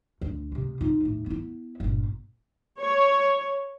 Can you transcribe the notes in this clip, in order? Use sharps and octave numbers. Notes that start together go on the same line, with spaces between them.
D2
C3 G#3
D#4 F4
D#2 A2
B3 E4
G1 A#2
C#5